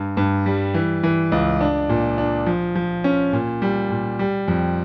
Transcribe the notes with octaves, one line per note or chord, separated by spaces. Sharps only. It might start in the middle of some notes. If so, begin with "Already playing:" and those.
Already playing: G2
G2
G3
E3
E3
C#2
D4
A#2
D4
F3
F3
C#4
A#2
G3
A#2
G3
F2